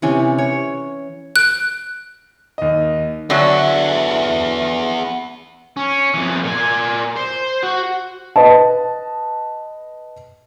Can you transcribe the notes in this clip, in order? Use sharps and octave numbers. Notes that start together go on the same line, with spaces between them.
C3 E3 C#4
C#5
F#6 D7
D#2 D#5
D3 F#3 B3 E5
C#4
F2 E3
A#2 G#5
C5
F#4
B4 D#5 A5